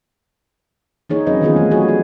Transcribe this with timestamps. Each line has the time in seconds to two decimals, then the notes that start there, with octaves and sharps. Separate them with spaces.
1.10 E3 A#3 D#4 G#4 C#5
1.27 E3 F#3 C4 C#4 B4 D#5
1.41 D#3 E3 B3 C#4 F4 G#4
1.56 G3 A3 D#4
1.71 F#3 F#4 G#4 C#5
1.88 F#4